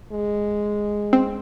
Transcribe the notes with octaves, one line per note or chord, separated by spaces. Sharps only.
G#3
C4